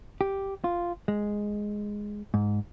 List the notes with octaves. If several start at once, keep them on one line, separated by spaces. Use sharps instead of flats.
G4
F4
G#3
G#2